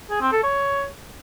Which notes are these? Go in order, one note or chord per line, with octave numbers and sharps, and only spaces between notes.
G#4
C4
A4
C#5